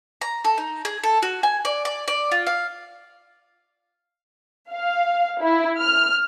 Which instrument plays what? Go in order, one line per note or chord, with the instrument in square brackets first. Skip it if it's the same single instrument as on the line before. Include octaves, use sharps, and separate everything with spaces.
[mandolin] A#5
A4
D#4
G#4
A4
F#4
G#5
D5
D5
D5
F4
F5
[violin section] F5
E4
F6